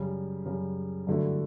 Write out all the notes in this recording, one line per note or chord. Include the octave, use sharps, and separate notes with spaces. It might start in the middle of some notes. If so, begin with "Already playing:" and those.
Already playing: F#2 C#3 G3
F#2 C#3 G3
G2 D3 F#3 A3 E4